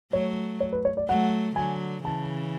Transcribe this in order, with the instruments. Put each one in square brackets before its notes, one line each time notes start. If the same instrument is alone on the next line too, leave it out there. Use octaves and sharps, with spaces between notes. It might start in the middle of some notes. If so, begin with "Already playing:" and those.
[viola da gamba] F#3 A3 [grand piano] C#5
[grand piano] C#5
B4
C#5
D5
[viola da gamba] F#3 A3 [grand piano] F#5
[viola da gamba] D3 F#3 [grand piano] G#5
[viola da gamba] C#3 E3 [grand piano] A5